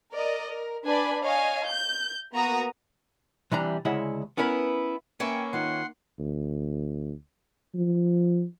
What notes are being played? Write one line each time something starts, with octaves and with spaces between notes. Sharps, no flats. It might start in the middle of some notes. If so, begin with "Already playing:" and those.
A#4 D5 D#5
A#4
D4 B4 D5 G#5 B5
C#5 D#5 F5 G#5
G6
A#3 B3 F#4 A#5 D#6
C3 E3 G3 D4 A#5
D2 C#3 G#3 E4 E5 F#5
B3 C#4 E4 A#4 B4
A#3 C#4 B4 E5 G5
D#3 F4 F#5 C6
D2
F3